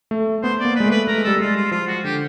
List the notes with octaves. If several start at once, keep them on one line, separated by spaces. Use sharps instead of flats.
A3
B3 C5
D5
A#3
G#3 B4
A3 B4
A3 A#4
G#3
G3 A4
G#3 F4
F4
F3 F4
F#4
D3 G4